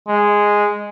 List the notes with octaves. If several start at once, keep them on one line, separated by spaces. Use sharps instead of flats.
G#3